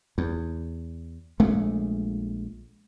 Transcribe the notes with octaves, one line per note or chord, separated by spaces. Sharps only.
E2
A#1 G#3 A3